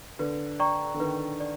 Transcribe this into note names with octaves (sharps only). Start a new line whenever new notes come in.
D3 B4
D5 G5 A#5 C#6
D3
D#3 B4
D5